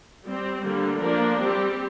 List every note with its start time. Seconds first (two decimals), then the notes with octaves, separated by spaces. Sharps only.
0.25 G3 C4
0.63 D3 G3 A#3
1.00 F3 A#3 D4 A#4
1.38 G3 C4 G4